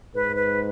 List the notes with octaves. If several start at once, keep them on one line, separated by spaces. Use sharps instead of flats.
G#2 B4
B4